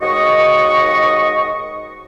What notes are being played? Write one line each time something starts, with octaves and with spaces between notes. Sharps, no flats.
D#2 G#2 F#4 D#5 C#6